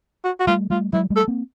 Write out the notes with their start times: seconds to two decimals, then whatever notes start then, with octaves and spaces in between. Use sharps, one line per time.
0.24 F#4
0.40 F#4
0.47 G3 A3 F4
0.70 G3 A3 F4
0.93 F#3 G#3 E4
1.10 G3 A3
1.16 A4
1.28 A#3 C4